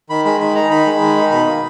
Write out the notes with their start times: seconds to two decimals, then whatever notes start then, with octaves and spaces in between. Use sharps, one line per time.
0.10 D#3 B5
0.25 G#3 B5
0.40 D#3 B5
0.55 D#4 A#5
0.70 D#3 B5
0.86 G#3
1.01 D#3
1.16 D#4
1.31 B2 B5
1.46 A#3